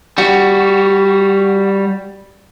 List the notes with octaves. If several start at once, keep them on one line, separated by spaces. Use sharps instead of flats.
G3 F#4